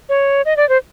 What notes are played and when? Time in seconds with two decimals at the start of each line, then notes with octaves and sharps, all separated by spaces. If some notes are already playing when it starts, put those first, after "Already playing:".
0.09 C#5
0.46 D#5
0.57 D5
0.69 C5